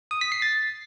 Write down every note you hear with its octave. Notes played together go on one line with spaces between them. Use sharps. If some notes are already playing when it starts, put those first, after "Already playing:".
D#6
B6
C7
A6